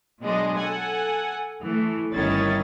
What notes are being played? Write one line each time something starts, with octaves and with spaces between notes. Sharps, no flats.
B2 F#3 G#3 D4 D#5
A4 F#5 G#5
E3 A3
G1 D#3 C#4 E4 A6